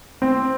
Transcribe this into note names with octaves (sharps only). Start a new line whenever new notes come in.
C4